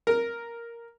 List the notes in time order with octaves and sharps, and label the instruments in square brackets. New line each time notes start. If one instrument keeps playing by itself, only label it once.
[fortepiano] A#4